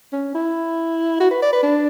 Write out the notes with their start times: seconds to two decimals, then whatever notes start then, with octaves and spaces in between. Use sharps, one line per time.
0.13 C#4
0.35 E4
1.20 F#4
1.31 B4
1.42 D5
1.53 B4
1.63 D4